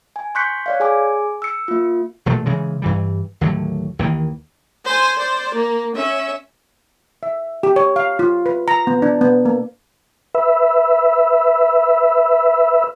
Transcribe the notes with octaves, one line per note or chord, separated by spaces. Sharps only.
G#5
C6 C#6 F#6 G6 B6 C#7
C#5 D5 F5
G#4 G#5 D6
E6 C#7
A#3 F4
E1 A#2 A3
C#3 E3 G#3
G2 E3 G3
D#2 A2 D3 F#3
D#2 D#3 E3 A#3
C5 G#5
C5 D5
A#3
C#4 E5
E5
G4
C#5
F5
F4
B4
A#5
B3
D4
B3
A#3
B4 E5